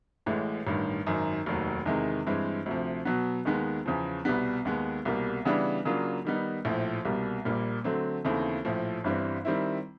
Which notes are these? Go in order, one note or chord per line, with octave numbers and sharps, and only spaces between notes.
A1 A2 E3 G#3
A1 G2 D#3
G#1 F#2 D#3
F1 D#2 D#3 F#3
E2 C3 D#3 G#3
G2 E3 G#3 C4
D2 C3 F3
B2 F#3 B3
D#2 D#3 G#3 B3
E2 C#3 F3
C2 B2 G3 B3
D#2 D#3 G#3 B3
C2 B2 G3 A#3
C#3 E3 G3 B3 D4
C#3 F#3 A#3 D4 F4
D#3 G3 B3 D#4
A#1 A2 F3
C2 B2 G3 A#3
A#1 A#2 G3 A#3
D3 F#3 A3 C4
D#2 C#3 E3 A3 C4
A#1 A2 F3
G1 G2 E3 G3 C4
D#3 G3 C4 E4